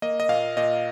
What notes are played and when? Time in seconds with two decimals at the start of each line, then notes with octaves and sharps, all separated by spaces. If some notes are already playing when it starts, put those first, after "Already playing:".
0.02 A#3 D#5
0.20 D#5
0.29 A#2 F5
0.57 A#2 D#5